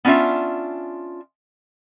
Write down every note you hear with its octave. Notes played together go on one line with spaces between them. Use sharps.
B3 C#4 D4 F4 E5